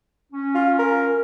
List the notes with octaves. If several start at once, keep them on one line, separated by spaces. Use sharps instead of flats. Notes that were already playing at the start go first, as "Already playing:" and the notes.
C#4
F4
A#4